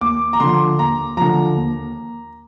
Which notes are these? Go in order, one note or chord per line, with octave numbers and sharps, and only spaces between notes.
D#2 D6
A#5
D3 F3 C6
D#2 A#5
D3 F3 A#5
D#2